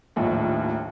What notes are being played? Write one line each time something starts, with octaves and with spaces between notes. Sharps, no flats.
D#1 A#1 D#2 A2 D#4